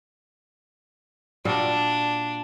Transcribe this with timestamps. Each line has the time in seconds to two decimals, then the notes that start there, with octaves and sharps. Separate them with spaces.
1.45 A#2 G3 D4 F#4